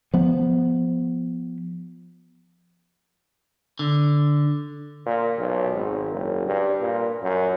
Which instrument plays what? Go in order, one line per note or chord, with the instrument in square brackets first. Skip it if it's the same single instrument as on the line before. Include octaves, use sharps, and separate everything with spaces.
[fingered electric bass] F3 B3
[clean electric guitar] D3
[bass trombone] A#2
B1
G#1
F#1
G2
A#2
F#2